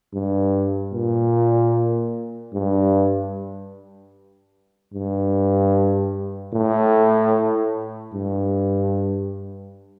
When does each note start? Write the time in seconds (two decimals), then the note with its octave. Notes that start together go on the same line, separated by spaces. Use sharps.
0.14 G2
0.93 A#2
2.54 G2
4.94 G2
6.54 A2
8.14 G2